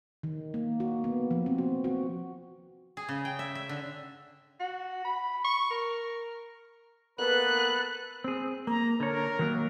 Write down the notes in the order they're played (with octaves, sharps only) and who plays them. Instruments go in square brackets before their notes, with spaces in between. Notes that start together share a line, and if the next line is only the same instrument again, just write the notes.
[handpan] D#3
A#3
F#4
B3
F3
C4
F#4
F#4
[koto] G#4
C#3
G5
E5
E5
D3
[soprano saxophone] F#4
B5
C#6
A#4
[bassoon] A#3 [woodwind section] B3 A4 B4 [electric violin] F#6
[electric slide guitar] C4 G#4
[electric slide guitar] A#3 [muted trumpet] A#5
[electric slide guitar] D3 C#5 [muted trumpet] A#4
[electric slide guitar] D#3 F#3 A#3